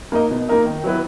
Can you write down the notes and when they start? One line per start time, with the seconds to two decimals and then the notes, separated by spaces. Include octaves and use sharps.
0.12 A#3 D#4 A#4 D#5
0.31 B2
0.49 A#3 D#4 A#4 D#5
0.66 D#3
0.84 F#3 B3 E4 B4